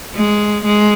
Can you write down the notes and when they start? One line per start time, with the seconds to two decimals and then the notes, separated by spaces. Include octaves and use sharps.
0.15 G#3
0.65 G#3